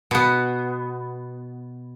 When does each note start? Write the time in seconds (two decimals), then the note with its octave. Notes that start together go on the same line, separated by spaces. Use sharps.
0.11 B2 B3